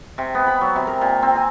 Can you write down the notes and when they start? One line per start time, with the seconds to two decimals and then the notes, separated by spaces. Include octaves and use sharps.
0.18 C3
0.35 B3
0.47 B5
0.61 F#3
0.76 C3
0.87 A#4
1.01 A#2
1.22 C4
1.35 G#5